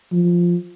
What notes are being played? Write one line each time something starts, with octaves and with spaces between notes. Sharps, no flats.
F3